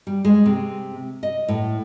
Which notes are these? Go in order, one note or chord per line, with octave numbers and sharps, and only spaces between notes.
G3
G#3
C3
D#5
A2